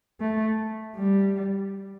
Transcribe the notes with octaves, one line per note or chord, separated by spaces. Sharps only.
A3
G3